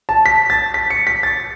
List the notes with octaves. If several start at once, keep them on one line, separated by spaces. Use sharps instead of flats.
A5
B6
A6
B6
C#7
B6
A6